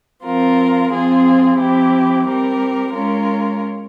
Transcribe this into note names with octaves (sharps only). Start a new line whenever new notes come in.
F3 C4 F4 A#4
F3 C4 F4 G#4
F3 C4 E4 G4
G3 C4 G4 A#4
G#3 C#4 F4 A#4